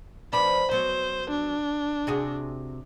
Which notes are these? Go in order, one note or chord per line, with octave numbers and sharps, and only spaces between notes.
F3 B3 D4 B5
F#3 B3 C5
D4
C3 F#4 G#4